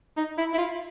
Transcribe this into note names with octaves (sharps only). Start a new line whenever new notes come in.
D#4
E4
E4
F4